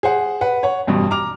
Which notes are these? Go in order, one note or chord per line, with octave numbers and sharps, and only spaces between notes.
G#4 C5 F#5
B4 F#5
C#5 F#5
A1 G2 B2
A#5 D6 F6 F7